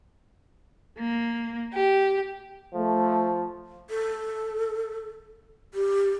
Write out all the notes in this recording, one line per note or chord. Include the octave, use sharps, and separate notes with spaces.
A#3
G4
F3 A3
A4
G4